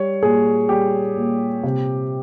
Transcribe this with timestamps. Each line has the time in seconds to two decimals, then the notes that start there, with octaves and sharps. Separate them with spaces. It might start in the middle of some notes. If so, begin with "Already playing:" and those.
Already playing: G3 C#5
0.23 A#2 G#4
0.69 G3 G4
1.17 A#2
1.63 C3